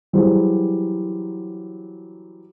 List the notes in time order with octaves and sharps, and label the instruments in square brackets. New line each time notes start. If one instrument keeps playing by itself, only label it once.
[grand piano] E3 F#3 G3 G#4 C5